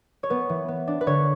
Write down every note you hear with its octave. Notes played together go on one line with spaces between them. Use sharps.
C#5
B3 B4
E3
B3
D4
B4
D3 C#5